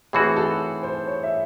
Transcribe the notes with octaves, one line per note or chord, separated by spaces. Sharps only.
A2 E3 C4 F#4 G#4
A4
C5
C#5
E5